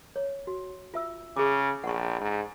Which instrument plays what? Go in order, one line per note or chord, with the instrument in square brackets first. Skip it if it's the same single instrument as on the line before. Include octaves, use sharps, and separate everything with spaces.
[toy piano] C#5
F#4
F4 E5 E6
[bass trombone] C#3 [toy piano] G#4 D6
[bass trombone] A#1 [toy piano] F#5 C#6
[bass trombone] G#2